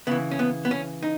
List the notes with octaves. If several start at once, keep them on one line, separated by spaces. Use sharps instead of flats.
C#3 E3 B3
C#4
B3
B3
C#4
D#4